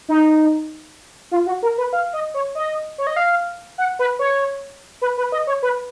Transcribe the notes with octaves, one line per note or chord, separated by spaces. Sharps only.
D#4
F4
F#4
A#4
B4
F5
D#5
C#5
D#5
C#5
D#5
F5
F#5
B4
C#5
B4
B4
D#5
C#5
B4